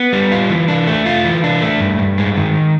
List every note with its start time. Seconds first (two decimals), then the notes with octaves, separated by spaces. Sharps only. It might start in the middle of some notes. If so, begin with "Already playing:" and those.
Already playing: B3
0.13 G3
0.32 F4
0.50 E3
0.68 D4
0.87 A3
1.06 F4
1.25 E3
1.44 D4
1.62 A3
1.81 G2
1.99 G2
2.18 G#3
2.37 D#3